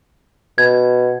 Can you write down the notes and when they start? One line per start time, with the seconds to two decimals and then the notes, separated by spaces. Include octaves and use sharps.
0.58 B2 G#6